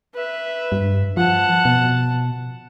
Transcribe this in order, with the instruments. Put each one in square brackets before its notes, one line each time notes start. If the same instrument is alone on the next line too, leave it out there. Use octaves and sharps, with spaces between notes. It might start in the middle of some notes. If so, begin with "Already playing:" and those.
[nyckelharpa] B4 E5
[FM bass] G2
[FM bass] F3 [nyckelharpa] F#5 A5
[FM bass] B2